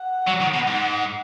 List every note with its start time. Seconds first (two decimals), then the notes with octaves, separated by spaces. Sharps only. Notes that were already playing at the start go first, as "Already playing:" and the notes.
Already playing: F#5
0.27 F#3
0.41 D#3
0.54 B2
0.67 G#2